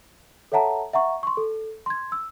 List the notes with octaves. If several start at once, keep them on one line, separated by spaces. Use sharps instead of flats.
A4 C#5 E5 F#5 A5 A#5
E5 F#5 A#5 C#6
C6 C#6
A4
C6 G#6
E6